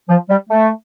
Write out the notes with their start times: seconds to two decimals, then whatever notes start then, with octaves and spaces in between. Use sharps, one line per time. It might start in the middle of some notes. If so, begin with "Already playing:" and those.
0.09 F3
0.29 G3
0.50 A3